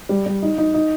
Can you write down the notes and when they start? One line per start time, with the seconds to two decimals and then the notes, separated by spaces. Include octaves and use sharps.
0.09 G3
0.26 G3
0.43 D#4
0.58 D#4
0.74 D#4